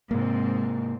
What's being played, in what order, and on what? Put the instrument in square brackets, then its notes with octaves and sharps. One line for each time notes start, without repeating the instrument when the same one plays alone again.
[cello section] G#2 G#3 C4 [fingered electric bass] C3 A#3